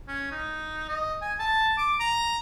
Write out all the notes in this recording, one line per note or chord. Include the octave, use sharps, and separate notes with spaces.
C#4
D#4
D#5
G#5
A5
D6
A#5